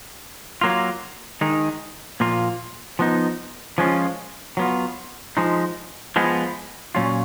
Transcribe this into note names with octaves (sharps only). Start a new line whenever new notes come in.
F#3 A#3 F4
D#3 G#3 D#4
A#2 F3 A#3 F4
F3 B3 D#4
F3 G#3 C#4 F4
F#3 B3 F4
F3 G#3 D#4
F3 G#3 B3
A#2 F#3 C#4 F4